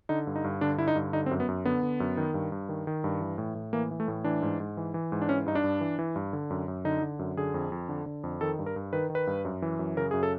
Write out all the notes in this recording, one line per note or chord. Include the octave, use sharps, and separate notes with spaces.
D3 D#4
G2
D#4
G2
D3 D4
D3 E4
D#4
G2
D3 D#4
C4
F#2
B3
F#2
D3 B3
D3
F#2
D#3
G2
G2
D#3
D#3
G2
E3
A2
A2
E3 A#3
E3
A3
A2
E3 D4
G#2
G#2
E3
E3
G#2
D4
E3 C#4
G2 D#4
D4
G2
E3
E3
G2
D3
F#2
F#2
D3 D#4
D3
F#2
D3 G#4
F2
F2
D3
D3
F2
D#3 A4
G2
A#4
G2
D#3 B4
D#3
B4
G2
F#2
E3
F#2
C#3 A#4
F#2 G#4
A4